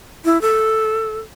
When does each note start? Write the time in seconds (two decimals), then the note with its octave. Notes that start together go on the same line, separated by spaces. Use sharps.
0.25 E4
0.41 A4